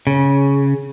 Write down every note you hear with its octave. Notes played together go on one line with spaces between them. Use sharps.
C#3